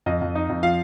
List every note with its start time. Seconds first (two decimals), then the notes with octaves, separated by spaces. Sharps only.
0.06 F2 D#5
0.21 F2
0.35 D#4
0.49 F2
0.63 F3 F5